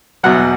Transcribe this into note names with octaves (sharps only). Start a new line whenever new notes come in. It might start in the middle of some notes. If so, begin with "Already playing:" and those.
E2 B2 F#3 F#5